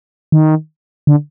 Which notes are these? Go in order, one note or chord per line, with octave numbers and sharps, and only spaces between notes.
D#3
D3